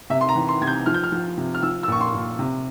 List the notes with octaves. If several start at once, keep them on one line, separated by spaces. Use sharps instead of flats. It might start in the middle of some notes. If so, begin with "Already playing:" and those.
C3 E5
C6
A#5
E3
C6
C3 G#6
G6
F3 F6
G6
F6
F3
C3
F6
F3 E6
E6
A#2 C#6
C6
A#2
C3